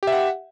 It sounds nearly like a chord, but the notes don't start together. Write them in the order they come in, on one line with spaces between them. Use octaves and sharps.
G4 E5 F#5